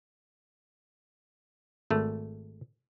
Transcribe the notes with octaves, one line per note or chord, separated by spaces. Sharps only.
G#1 A3